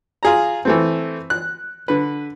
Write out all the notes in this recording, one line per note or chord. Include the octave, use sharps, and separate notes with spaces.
F4 G#4 A#5
E3 A3 C4
F#6
D3 B4